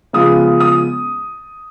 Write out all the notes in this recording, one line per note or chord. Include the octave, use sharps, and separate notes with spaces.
C#3 F3 G#3 B3 D#6
D#6